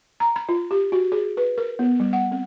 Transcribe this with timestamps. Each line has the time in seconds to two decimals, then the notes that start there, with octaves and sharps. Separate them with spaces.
0.20 A#5
0.36 B5
0.49 F4
0.71 G4
0.92 F#4
1.12 G#4
1.37 B4
1.58 A#4
1.79 B3
2.00 G3
2.13 F#5
2.32 C4